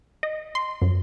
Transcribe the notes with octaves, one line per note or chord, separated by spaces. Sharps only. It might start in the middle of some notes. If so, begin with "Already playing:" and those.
D#5
C6
F#2